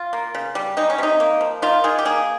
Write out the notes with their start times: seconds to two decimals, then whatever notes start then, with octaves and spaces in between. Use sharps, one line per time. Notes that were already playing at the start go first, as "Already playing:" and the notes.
Already playing: F4
0.13 A#3
0.35 C#3
0.55 G3
0.77 G#3 D#4
0.90 C#4
0.98 C3 D#4
1.20 A#3
1.41 F3
1.62 D#3 F4
1.84 D#3 G#4
1.99 G4
2.05 A#3 G#4